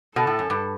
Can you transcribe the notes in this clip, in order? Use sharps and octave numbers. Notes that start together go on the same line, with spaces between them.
B2 A4
A2
F#2
G2